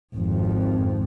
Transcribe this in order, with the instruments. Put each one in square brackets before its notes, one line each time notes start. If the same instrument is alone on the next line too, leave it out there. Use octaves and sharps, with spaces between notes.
[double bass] G#1 F2